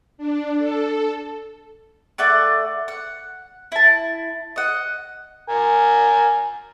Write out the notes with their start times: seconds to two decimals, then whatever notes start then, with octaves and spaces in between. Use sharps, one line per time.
0.18 D4
0.58 A4
2.18 A3 D5 F#5 D6
2.88 F#5
3.72 E4 A5
4.56 D#5 F#5
5.49 A#4 G#5